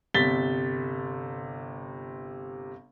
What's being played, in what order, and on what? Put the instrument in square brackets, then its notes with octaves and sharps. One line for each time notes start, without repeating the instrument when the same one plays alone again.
[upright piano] G1 C3 A6 B6 G7